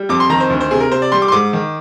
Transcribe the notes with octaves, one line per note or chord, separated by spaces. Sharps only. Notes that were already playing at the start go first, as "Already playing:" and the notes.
Already playing: G3
F2 D6
C6
D#3 A#5
C5
D2
C5
C3 G#4
A#4
C3 C5
D5
G3 C6
D6
C6
G#2 D6
D#3